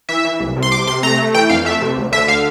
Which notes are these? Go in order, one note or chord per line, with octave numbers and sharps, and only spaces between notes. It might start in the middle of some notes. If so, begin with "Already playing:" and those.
E3 E5
E3
C2
C3
C6
C3 D6
C3 C6
A3 A#5
A3
E3 G5
F2 F5
A3 E5
C3
D2
D3 E5
F5